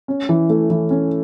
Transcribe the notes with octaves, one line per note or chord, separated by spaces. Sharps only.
C#4
E3
A3
E3
C#4